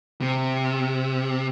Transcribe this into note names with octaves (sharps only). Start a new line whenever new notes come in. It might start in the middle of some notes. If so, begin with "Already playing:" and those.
C3